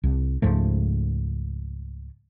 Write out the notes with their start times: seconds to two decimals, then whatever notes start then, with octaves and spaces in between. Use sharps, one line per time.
0.04 C2
0.42 C#2 G#2 F3 A3